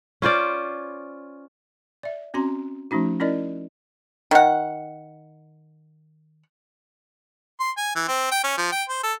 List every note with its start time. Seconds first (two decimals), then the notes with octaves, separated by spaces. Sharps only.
0.22 C#4 F4 C5 D5
2.03 D5 E5
2.34 C4 C#4 F#4 A#5 C6
2.91 F3 A3 C#4 D#4 F#4
3.20 C#4 E4 A#4 D5 D#5
4.31 D#3 F#5
7.60 C6
7.77 G#5
7.96 E3
8.08 C4
8.31 G5
8.44 C#4
8.58 F3
8.72 G5
8.89 C5
9.03 A4